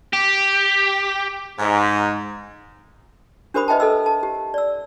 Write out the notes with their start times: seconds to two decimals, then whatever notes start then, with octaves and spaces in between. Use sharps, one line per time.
0.13 G4
1.59 G#2
3.54 D4 G4 A#4 C5 B5 D#6
3.68 B4 D#5 E5 G5 A5
3.80 A4 D#5 E6
4.06 A5
4.23 G4
4.54 D5 E6